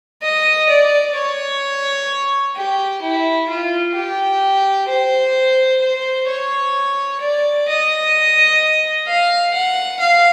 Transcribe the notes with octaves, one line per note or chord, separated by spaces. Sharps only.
D#5
D5
C#5
G4
E4
F4
G4
C5
C5
C#5
D5
D#5
F5
F#5
F5